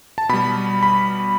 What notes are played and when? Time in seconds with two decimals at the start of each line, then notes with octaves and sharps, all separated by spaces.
0.18 A5
0.29 B2 G3 B5
0.83 B5